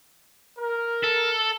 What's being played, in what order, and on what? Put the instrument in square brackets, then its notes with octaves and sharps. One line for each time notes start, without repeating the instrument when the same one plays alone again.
[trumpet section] A#4
[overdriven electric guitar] A4